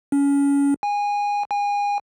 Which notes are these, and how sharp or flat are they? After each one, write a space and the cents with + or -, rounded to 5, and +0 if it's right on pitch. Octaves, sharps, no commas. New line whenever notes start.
C#4 +25
G#5 -20
G#5 -30